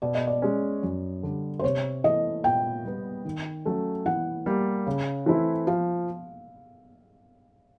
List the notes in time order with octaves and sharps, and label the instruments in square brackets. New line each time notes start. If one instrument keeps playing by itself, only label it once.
[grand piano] B2 [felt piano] D5
[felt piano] D#5
D5
[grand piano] G#3 C#4
F#2
D3 G3
[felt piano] C5
[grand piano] C3 [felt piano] C#5
[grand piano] E3 A3 [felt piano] D#5
[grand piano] A#2 [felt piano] G5
[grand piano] G3 B3
D#3
F#3 A3 C#4
[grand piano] E3 [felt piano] F#5
[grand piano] G3 A#3
C#3
E3 A3 C4 E4
[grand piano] F3 [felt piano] F5